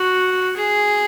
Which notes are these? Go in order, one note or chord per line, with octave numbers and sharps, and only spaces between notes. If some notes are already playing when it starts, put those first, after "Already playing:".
Already playing: F#4
G#4